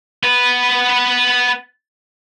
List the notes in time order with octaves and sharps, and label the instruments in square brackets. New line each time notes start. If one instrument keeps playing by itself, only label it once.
[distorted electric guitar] B3 B4